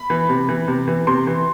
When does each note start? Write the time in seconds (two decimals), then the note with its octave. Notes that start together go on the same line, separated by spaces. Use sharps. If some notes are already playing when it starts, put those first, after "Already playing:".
Already playing: B5
0.10 E3
0.29 C3
0.49 E3
0.68 C3
0.88 E3
1.07 C3 C6
1.27 E3